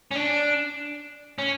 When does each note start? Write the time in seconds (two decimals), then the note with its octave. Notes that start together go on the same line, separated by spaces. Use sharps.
0.11 C#4
0.15 D4
1.38 C#4